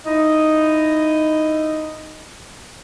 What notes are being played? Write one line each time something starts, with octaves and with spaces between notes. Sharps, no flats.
D#4 E4 D#5